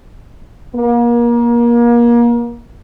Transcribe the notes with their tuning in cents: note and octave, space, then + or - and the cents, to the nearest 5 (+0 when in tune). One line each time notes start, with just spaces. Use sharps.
A#3 +30